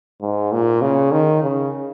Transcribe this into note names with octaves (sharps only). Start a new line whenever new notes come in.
G#2
A#2
C#3
D#3
C#3